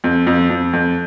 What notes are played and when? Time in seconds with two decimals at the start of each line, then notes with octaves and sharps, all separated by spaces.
0.04 F2
0.27 F2
0.49 F2
0.73 F2